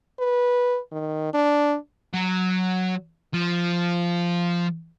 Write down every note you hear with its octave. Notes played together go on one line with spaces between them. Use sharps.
B4
D#3
D4
F#3
F3